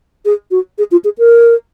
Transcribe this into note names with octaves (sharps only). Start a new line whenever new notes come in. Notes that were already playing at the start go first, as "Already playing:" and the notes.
G#4
F#4
G#4
F4
G#4
A#4